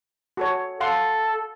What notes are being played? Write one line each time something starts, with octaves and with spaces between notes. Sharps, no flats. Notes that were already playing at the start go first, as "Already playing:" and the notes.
F#4 A4 C#5
A4 F5 F#5 C6